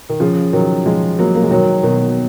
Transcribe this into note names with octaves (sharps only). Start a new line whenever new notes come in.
D#3
C#3 F3
D#3 F#3
F3 G#3
F#3 A#3
A#3
G#3
D#3 F#3
B2 D#3